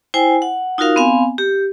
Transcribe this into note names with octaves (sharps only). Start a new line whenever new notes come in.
E4 C5 G5 G#5
F#5
D#4 F4 F#4 A#4 F5
B3 C4 F5 G#5
G4